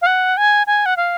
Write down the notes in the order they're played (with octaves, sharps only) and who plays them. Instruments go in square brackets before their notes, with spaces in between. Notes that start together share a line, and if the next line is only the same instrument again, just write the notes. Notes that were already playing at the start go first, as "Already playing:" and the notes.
[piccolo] F5
F#5
G#5
G#5
F#5
F5